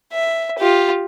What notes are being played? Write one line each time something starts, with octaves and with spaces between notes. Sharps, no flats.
E5
F4 G4